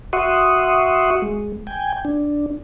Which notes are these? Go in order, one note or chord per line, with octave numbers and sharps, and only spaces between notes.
F#4 E5 F#5 C6 C#6 D#6
G#3
G5 G#5
D4